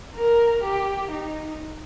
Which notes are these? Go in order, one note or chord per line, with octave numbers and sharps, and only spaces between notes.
A#4
G4
D#4